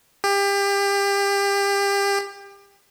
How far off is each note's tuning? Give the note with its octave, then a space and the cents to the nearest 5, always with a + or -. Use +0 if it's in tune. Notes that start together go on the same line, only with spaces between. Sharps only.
G4 +30